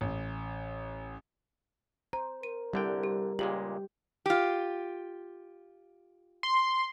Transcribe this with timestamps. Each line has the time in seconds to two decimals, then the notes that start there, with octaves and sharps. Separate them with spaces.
0.01 A1
2.13 C5 A#5
2.43 A#4 D#7
2.73 C2 D3 G3 G5
3.03 G4
3.39 C#2 A#2 G#3 G4 F#7
4.26 F4 G4
6.43 C6